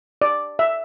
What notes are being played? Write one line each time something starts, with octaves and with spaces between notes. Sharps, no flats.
D5
E5